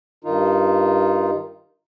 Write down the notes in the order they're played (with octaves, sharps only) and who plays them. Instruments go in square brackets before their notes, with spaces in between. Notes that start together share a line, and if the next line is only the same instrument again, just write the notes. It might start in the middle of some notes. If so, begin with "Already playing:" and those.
[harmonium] G2 D#3 D#4 F4